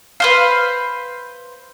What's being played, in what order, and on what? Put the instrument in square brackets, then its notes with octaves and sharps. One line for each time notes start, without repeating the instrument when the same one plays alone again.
[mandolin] B4 C5 F5